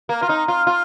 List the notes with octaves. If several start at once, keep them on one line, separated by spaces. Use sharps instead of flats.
A#3
F4
D#4
F4
F4